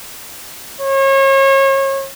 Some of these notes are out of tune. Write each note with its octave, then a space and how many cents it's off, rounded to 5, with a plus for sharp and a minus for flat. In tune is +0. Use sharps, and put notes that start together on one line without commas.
C#5 -35